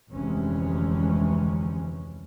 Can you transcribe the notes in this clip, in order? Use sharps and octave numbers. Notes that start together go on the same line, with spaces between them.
F1 D2 C3 E3 G#3 C#4